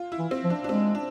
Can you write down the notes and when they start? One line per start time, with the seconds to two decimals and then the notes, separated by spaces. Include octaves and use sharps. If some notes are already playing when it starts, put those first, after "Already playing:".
Already playing: F4
0.12 E4
0.19 E3
0.31 C4
0.44 F3
0.50 D4
0.64 D4
0.69 G#3 C4
0.95 D4